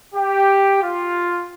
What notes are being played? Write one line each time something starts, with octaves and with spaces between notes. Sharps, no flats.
G4
F4